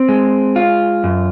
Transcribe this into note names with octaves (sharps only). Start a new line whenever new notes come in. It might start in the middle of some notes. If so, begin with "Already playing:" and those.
Already playing: C4
G#3
F4
F#2